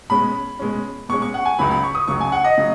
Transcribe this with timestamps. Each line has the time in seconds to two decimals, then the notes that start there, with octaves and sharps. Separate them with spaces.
0.10 B2 G#3 C#4 B5
0.59 B2 G#3 C#4
1.09 B2 G#3 C#4 C#6
1.22 C#6
1.34 F#5
1.45 G#5
1.59 C#2 C#3 F#3 B5
1.71 B5
1.84 C#6
1.95 D#6
2.08 C#2 C#3 F#3 C#6
2.21 G#5
2.32 F#5
2.44 D#5
2.58 C#3 F#3